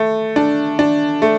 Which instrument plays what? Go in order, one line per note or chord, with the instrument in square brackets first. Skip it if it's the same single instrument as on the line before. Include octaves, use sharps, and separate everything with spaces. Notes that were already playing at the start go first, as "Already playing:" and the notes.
Already playing: [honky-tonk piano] A3
D4
D4
A3